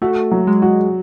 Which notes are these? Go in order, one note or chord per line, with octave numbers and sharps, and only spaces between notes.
A3 F#4
F#3
G#3
F#4